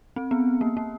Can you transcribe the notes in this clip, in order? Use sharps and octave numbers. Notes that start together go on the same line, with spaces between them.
C4
B3
A#3
A#3